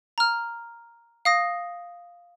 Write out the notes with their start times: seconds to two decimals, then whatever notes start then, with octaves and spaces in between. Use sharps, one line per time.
0.18 A#5 F6
1.25 F5 D#6 A#6